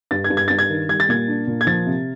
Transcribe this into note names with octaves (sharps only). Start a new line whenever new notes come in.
G2 A6
G#6
G2
G#6
G2 A6
G#6
D#3
G3 G#6
A6
A#2 G#6
D4
A#2
G#6
F3 A6
C3